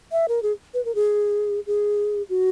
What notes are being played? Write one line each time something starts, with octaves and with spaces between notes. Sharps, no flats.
E5
A#4
G#4
B4
A#4
G#4
G#4
F#4